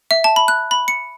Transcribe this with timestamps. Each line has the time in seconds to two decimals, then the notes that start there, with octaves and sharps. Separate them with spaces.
0.11 E5
0.24 A5
0.36 B5
0.48 F#6
0.71 B5
0.88 C#7